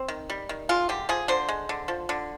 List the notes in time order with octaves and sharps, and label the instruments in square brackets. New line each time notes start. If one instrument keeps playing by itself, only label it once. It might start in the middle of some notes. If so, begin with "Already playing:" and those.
Already playing: [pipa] C4
D#3
G3
D#3
G#3 F4
D3 G4
F3 G#4
D3 C5
G#3
D3
F3
D3